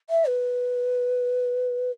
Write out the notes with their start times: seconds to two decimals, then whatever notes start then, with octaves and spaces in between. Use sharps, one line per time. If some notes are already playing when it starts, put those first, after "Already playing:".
0.10 E5
0.27 B4